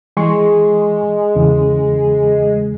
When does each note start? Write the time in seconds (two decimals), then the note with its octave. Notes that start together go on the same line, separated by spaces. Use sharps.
0.17 E3 G#3 C6 C#6
1.35 E2 C#3 E3